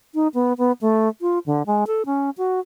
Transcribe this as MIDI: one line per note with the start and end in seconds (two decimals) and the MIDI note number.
0.15 0.28 63
0.34 0.53 59
0.58 0.72 59
0.81 1.08 57
1.21 1.39 65
1.46 1.63 50
1.66 1.84 56
1.87 2.03 69
2.06 2.30 61
2.38 2.60 66